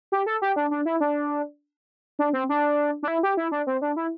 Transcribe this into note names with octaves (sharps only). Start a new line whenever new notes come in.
G4
A4
G4
D4
D4
E4
D4
D4
C4
D4
D4
E4
G4
E4
D4
C4
D4
E4